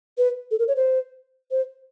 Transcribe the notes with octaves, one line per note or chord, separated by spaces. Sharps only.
B4
A4
A#4
C#5
C5
C5